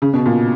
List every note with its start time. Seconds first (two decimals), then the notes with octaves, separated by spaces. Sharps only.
0.02 C#3
0.14 B2
0.26 A#2